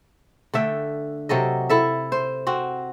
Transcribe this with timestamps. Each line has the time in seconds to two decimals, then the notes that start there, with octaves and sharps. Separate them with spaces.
0.54 D3 A3 E5 G5
1.29 C3 F#3 A4 D#5
1.69 E4 A4 E5
2.12 C5
2.47 C4 F#4